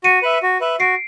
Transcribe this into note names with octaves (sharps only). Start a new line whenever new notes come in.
F#4 C#7 D#7
B4 E5
F#4
B4 E5
F#4 C7 D7